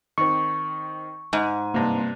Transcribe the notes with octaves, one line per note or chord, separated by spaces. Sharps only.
D#3 C4 C#6
G#2 G#5
G2 C3 A#3